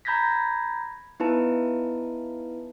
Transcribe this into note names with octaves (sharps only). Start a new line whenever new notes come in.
A#5 B5 G6 G#6 A#6 B6
B3 D#4 E4 B4 A5